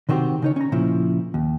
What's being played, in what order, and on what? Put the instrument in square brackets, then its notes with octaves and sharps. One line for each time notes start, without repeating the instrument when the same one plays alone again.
[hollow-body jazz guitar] C3 D#3 C4 F#4 G4 C5
C#3 D#4 C#5
C#4 A#5
A#2 C#3 F3 E4
D#2